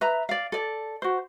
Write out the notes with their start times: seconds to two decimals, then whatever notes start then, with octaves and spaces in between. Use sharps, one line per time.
0.01 B4 E5 A#5
0.29 D5 F5
0.52 A4 D5
1.02 F#4 C5